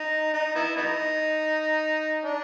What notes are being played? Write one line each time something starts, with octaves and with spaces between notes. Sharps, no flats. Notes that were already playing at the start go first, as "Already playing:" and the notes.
Already playing: D#4
D#4
B3 E4
B3 D#4
D4